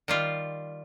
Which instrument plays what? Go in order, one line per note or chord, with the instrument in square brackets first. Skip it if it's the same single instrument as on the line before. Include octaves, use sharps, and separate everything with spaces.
[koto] D#3 G3 F4